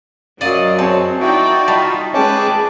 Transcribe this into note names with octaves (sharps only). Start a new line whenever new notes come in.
F#2 F#3 D5 D#5 F5
C4 G#4 C#5 A5
D#4 E4 F#4 D5 G5
G3 D#4 F4 A5 B5
G#3 C#4 G#4 B4 G5 A5 D6